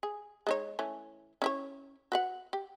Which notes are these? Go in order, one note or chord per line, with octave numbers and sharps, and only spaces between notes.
G#4
G#3 D#4 C#5
E3 A3 C#4
C#4 E4 C#5
F#4 B4 F#5
G4